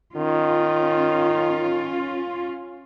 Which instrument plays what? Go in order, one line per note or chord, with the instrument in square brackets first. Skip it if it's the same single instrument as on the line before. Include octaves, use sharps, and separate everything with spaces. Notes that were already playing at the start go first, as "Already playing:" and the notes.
[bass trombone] D#3 [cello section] C#4 F4